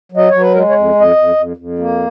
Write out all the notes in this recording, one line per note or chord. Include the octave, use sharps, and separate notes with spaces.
F#3
D#5
F#3 C#5
B4
G#3 A#4
C#5
F2
F2 D#5
F2
F2
F2
A#3